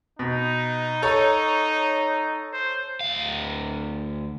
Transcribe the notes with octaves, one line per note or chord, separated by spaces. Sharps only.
B2 D#4
A4 C#5 A#5
C5
D2 F5